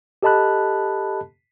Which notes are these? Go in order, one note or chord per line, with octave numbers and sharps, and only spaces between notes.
G4 A4 D#5 A5 B5 F#6